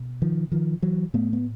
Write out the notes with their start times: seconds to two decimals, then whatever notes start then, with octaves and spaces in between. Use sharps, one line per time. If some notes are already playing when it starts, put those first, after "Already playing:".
Already playing: B2
0.22 D#3 F3
0.52 D#3 F3
0.82 E3 F#3
1.14 A2 A3 B3
1.33 B3